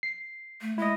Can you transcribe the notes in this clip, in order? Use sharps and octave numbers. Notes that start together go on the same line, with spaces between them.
C7
A3
G#3 E4 D#5